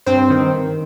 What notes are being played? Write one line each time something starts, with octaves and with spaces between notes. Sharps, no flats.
G2 C4 C5
D#3